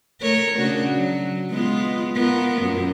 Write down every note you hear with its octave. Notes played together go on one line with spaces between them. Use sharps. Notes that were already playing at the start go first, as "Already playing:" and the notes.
A3 A#4 C#5
C#3 D4 F#4
F#3
G#3 B3 F4
B3 F4 A#4
F#2